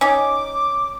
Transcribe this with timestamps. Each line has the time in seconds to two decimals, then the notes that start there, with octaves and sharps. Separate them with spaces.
0.01 C#4 D#4 D6